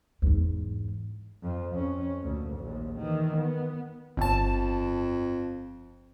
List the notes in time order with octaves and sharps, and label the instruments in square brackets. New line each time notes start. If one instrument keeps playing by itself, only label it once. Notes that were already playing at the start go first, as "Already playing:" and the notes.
[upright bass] E2 G#2
[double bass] F2 F3
F2 C#4
D2 A#2
A#1 D#2
D#3 E3
B3
[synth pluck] G1 A5 [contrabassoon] F2